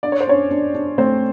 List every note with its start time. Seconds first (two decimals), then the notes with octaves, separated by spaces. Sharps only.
0.03 D4 D5
0.12 C#5
0.20 C5
0.27 C#4 D4 C#5
0.51 D4
0.74 D4
0.98 A3 C4 C5